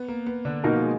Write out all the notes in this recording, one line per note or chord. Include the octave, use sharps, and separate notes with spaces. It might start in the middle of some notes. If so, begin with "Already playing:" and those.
Already playing: B3
A#3
B3
D3 D4
B2 A#3 D#4 A#4
F3 F4
G#3 G#4